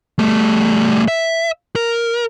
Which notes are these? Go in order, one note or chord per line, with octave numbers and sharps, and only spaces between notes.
G3 A3
E5
A#4